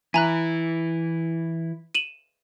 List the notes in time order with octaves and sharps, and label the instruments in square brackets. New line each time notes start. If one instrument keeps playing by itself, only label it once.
[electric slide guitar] E3 E4 [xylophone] G#5 A#5 F#6
[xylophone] D#7 E7 F#7